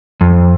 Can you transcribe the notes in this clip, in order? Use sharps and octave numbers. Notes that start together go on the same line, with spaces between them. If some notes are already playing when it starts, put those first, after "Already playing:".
F2